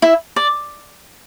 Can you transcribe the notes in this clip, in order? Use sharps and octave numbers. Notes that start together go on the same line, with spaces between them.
E4 E5
D5